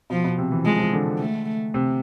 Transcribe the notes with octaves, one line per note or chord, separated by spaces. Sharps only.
B2 F3
B2
C3
E3
F3 G#3
F3
D3
A3
C3